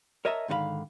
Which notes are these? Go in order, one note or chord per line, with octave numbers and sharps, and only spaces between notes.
A#4 C#5 D#5 E5 A5 A#5
G#2 D3 D#3 B4 F5 B5